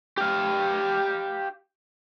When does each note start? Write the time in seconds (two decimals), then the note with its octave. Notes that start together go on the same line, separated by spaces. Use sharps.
0.17 G4 F5